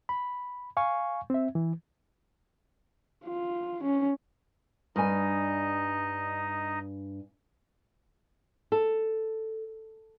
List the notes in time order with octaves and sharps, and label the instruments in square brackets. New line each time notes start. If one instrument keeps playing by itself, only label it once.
[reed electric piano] B5
F5 G#5 C#6
C4 E5
E3
[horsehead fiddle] F4
C#4
[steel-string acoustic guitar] G2 G#5 [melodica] D#4 D#5
[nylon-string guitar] A4